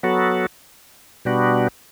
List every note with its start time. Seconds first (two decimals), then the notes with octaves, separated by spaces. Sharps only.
0.03 F#3 B3 F#4 A4
1.25 B2 G3 B3 D4 F#4